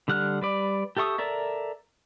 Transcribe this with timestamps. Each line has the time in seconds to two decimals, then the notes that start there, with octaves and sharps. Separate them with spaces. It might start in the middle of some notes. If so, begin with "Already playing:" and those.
0.08 D3 G3 F#5 F6 F#6
0.42 G3 B4 D5
0.97 G4 A4 E5 C#6 D#6
1.18 A4 A#4 D5 E5